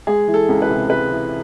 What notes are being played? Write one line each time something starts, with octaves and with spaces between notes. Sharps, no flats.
G#3 G#4
E3
A4
C#2
B4
C3
G#3 B4
E3